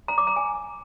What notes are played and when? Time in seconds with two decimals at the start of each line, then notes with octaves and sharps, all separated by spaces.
0.08 A#5
0.18 D6
0.27 A#5
0.36 G#5